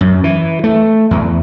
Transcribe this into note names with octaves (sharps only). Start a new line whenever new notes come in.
F#2
E3
A3
E2